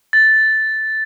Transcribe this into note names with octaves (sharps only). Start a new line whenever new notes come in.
A6